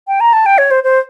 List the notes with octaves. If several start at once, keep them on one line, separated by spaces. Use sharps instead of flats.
G5
A#5
A5
G5
C#5
C5
C5